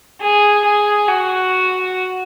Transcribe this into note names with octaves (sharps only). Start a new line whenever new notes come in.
G#4
G#4
F#4